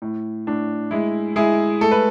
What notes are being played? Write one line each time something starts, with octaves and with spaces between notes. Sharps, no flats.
A2
A2 D4
G#3 E4
G#3 E4 G#4
A3 A4
B4